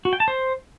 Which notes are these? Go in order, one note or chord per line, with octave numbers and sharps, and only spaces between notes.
F#4
G5
A5
C5